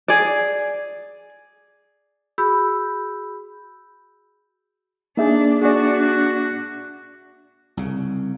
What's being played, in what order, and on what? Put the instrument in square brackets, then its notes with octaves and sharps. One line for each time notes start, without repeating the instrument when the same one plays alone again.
[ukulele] G#4 D5
[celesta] F#4 G#4 B5 E6 G6
[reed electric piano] A#3 E5 [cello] D4 [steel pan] D#4 G#4
[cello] D4 [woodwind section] F#4 [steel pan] G#4 D5
[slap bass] C2 C#3